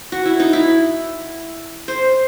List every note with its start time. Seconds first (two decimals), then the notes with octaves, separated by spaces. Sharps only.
0.12 F#4
0.25 E4
0.40 D#4
0.53 E4
1.88 C5